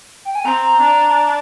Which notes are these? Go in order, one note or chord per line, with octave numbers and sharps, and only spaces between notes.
G5
G#5
C4 A#5
A#5
D4